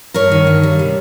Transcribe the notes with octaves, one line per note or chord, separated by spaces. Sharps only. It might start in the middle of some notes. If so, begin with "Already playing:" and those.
G2 A#4 C#5
D#3
G2
G3
C3